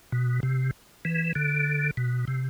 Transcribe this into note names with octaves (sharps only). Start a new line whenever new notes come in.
B2
C3
E3
D3
B2
C3